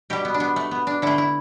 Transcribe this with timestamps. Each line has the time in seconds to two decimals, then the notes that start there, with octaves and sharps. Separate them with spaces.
0.10 B2 G3 G4
0.25 B3
0.34 D4
0.40 B3
0.56 A3
0.71 B3
0.87 D4
1.02 D3 A3 E4
1.18 E4